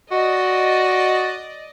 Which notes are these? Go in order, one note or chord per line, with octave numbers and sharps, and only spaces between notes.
F#4 D5 D#5